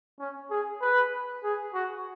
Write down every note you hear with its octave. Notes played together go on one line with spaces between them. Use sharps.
C#4
G#4
B4
G#4
F#4